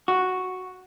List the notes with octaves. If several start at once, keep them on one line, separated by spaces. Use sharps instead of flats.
F#4